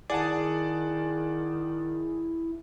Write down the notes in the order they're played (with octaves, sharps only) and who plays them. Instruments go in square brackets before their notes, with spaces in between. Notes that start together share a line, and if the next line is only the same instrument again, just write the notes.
[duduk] D#3 [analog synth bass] E4 [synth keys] G#4 [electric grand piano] D5 F#5 A5